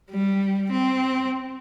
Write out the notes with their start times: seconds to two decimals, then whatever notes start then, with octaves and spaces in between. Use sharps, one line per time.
0.11 G3
0.72 C4